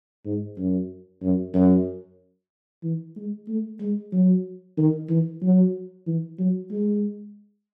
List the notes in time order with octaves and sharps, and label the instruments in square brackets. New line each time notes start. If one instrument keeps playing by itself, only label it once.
[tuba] G#2
F#2
F#2
F#2
E3
G#3
A3
G#3
F#3
D#3
E3
F#3
E3
F#3
G#3